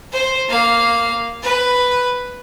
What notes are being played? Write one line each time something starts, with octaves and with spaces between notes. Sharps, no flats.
C5
A#3 F5
B4